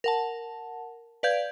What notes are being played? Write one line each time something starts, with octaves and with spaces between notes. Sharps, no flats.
A#4 F#5 A5
B4 D5 F5 G6 G#6